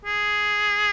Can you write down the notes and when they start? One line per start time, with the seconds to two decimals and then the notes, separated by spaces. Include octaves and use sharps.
0.05 G#4